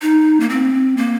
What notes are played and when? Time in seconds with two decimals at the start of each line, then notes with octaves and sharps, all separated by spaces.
0.02 D#4
0.40 A#3
0.49 C4
0.97 A#3